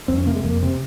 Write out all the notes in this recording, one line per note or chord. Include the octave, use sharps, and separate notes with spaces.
F2 C4
C#4
C3 A#3
G#3
F2 A#3
C3 C4